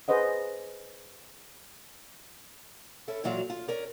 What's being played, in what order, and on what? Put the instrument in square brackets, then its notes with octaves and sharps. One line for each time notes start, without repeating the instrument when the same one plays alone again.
[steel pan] G#4 B4 C5 D#5 F#5
[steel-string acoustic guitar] C#4 E4 A4
A#2 E3 F#3 F4 F#4 F5
F4
C#4 A#4 D5